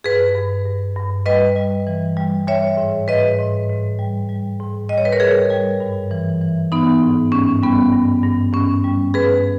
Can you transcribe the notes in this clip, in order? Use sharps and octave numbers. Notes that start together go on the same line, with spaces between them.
G2 G#4 B4
G2
G2
G2
G3 B4 D#5
G3
E3
G3
G3 C#5 E5
G#2
G#2 B4 D#5
G#2
G#2
G3
G3
G#2
G3 D#5
C#5
B4
A#4 C#5
G3 G#4 B4
G3
G2
E3
E3
E3 B3 D#4
G#2
G2 C#4
G3 B3
G2
G2
G2 C#4
G3
G2 G#4 B4